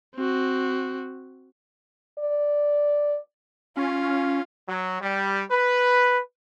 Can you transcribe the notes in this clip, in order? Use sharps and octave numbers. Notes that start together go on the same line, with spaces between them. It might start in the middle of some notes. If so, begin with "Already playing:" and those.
C4 F#4
D5
C#4 F4
F#3
G3
B4